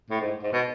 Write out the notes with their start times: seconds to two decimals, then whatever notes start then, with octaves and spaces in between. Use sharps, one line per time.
0.10 A2
0.20 G#2
0.43 G#2
0.53 B2